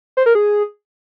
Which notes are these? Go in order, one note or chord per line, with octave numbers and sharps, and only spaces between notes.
C5
A#4
G#4